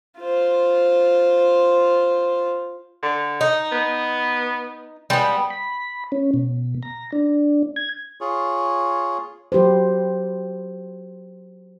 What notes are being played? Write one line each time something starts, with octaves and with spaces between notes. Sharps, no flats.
F4 C5
D3
D#4
B3
G3 G#3 B3
B5
C#4
B2
A#5
D4
G#6
F4 G#4 C#5
F#3 G4 B4 C5